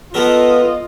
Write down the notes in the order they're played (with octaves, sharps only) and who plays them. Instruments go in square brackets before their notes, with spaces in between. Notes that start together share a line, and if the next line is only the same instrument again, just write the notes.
[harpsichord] B3 A4 A#4 [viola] F4 D#5